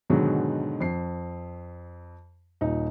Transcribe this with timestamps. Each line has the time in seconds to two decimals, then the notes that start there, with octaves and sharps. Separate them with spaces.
0.10 G#2 B2 D3 D#3 F#3 G#3
0.81 F2 C7
2.61 D#1 D#4